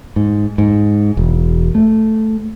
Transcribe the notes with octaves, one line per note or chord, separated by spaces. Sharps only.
G#2
G#2
E1
A3